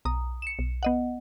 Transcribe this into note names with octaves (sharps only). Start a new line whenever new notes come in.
B1 A#5 D#6
C#7 E7
B1
B3 D#5 F#5